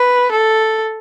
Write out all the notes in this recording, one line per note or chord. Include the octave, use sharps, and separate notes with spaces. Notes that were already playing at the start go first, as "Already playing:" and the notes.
Already playing: B4
A4